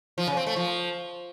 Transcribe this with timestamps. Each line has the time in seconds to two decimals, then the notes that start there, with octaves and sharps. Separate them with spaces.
0.18 F3
0.27 C#3
0.37 C4
0.47 A3
0.56 F3